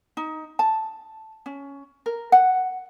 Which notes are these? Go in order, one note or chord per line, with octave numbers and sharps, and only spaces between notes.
D#4
A5
C#4
A#4
F#5